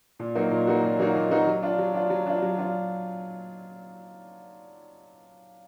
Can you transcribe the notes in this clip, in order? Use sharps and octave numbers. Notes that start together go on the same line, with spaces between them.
A#2
F#3 A#3 D#4 F#4
A#2
F#3 A#3 D#4 F#4
A#2
F#3 A#3 D#4 F#4
A#2
F#3 A#3 D#4 F#4
F#3
D4 F4
F#3
D4 F4
F#3
D4 F4
F#3
D4 F4